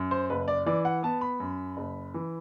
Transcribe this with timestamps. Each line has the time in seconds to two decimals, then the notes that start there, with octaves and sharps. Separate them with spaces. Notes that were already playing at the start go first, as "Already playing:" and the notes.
Already playing: F#2
0.11 C5
0.30 F#1 B4
0.48 D5
0.66 E3 D5
0.85 F#5
1.03 B3 A5
1.21 B5
1.40 F#2
1.77 F#1
2.14 E3